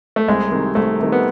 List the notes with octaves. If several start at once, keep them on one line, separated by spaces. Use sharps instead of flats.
A3
C2 G#3
C3 D#3
C2 A3
C3 D#3
B3